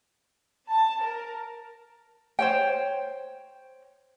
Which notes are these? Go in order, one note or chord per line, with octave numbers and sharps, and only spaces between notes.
A5
A#4
C5 C#5 G5